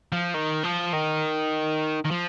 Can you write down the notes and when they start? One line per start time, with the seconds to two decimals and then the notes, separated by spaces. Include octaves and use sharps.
0.12 F3
0.34 D#3
0.64 F3
0.93 D#3
2.05 D#3
2.11 F3